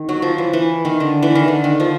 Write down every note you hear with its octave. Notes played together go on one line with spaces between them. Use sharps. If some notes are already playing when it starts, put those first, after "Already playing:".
Already playing: D#3
F#3
F3
E3
E3
D#3
D3
E3
D#3
D3
D#3
F3